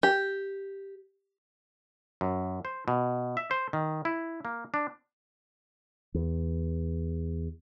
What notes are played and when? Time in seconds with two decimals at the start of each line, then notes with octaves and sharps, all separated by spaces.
0.03 G4
2.21 F#2
2.65 C5
2.88 B2
3.37 E5
3.51 C5
3.73 D#3
4.05 E4
4.45 A#3
4.74 D4
6.14 E2